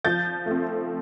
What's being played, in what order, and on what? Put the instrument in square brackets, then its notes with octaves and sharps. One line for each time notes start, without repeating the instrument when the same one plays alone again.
[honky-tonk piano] F3 G6 A6
A3
C4